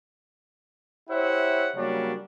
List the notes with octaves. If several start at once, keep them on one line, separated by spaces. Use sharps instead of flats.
E4 G4 C5 C#5 E5 F#5
C#3 F#3 G3 A#3 C#4 D4